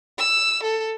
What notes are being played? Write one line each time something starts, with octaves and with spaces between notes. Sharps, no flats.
E6
A4